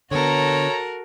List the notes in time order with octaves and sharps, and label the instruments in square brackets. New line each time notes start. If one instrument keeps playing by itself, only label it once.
[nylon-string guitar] D3 B3 [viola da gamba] F#4 A#4 [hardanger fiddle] A4 A#5 [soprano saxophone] C#5